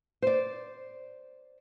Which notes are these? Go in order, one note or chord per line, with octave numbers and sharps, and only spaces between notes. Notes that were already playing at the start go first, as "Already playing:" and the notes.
C5 D5